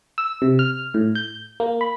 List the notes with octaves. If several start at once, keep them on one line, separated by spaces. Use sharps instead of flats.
E6
C3
F6
A2
G6
A#3
B5